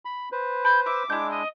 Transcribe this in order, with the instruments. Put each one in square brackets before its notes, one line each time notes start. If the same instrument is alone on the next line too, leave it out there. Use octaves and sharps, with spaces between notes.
[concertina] B5
B4 C5
[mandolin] B5 [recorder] G6
[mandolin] E5 [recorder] D6
[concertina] G#3 D4 [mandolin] E4 G6
[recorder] D#5